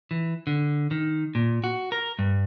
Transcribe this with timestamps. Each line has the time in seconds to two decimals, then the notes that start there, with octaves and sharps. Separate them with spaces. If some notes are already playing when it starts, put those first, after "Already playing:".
0.11 E3
0.47 D3
0.91 D#3
1.35 A#2
1.64 F#4
1.92 A#4
2.19 G2